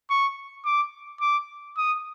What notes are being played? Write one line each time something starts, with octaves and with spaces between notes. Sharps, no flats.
C#6
D6
D6
D#6